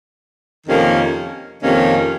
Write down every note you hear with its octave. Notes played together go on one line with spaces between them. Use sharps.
F2 C3 D#3 A#3 C#4
F2 C3 D#3 A#3 C#4